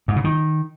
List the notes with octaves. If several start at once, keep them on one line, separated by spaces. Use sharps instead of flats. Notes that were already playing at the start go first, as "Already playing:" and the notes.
G#2
C#3
D#3